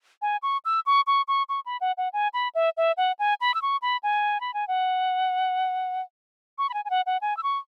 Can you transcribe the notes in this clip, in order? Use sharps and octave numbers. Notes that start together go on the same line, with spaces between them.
G#5
C#6
E6
C#6
C#6
C#6
C#6
B5
F#5
F#5
G#5
B5
E5
E5
F#5
G#5
B5
E6
C#6
B5
G#5
B5
G#5
F#5
C#6
B5
G#5
G#5
F#5
F#5
G#5
E6
C#6